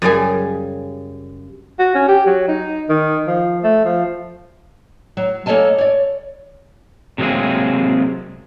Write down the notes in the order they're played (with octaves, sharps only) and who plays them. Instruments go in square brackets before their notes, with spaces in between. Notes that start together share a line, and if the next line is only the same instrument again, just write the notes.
[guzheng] F#2 C#3 G3 G#4
[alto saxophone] F#4
C#4
G4
F#3
D#4
D#3
F3
A3
F3
[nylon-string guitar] F#3
A#3 A4 C#5 D#5 G#5 A5
C#5 D5
[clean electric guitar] C3 F#3 G#3 A#3 C4 G#4